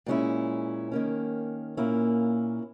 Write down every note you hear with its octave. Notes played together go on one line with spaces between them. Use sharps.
A#2 G#3 C#4 E4
D#3 A#3 C#4
A#2 A#3 C#4 E4